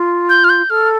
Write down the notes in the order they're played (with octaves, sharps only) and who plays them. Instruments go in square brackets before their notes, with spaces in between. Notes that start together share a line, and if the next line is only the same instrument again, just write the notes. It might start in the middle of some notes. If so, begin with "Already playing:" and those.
Already playing: [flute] F4
[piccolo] G6
F6
G6
[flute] A4 [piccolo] F6